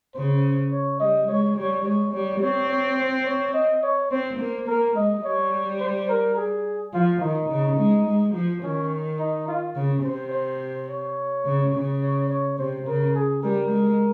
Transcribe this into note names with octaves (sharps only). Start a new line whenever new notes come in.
C#3 C5
C#5
G3 D#5
G#3 C#5
G3 C#5
G#3 C#5
G3 C#5
C4 C#5
C#5
C5
C#5
D#5
C#5
C4 C5
A#3
A#3 A#4
G#3 D#5
G3 C#5
C5
A#4
G#4
F3 F4
D#3 D#4
C#3
G#3
G#3
F3
D#3 C#4
D#4
F4
C#3
C3 C5
C5
C#5
C#3
C#3
C#5
C#5
C3 C5
C#3 A#4
G#4
G3 A#4
G#3